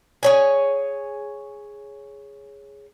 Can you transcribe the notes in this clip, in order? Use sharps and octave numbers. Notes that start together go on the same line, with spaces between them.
G#4 C#5 G#5